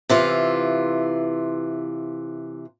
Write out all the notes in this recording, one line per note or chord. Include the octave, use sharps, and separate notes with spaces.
C3 E3 F4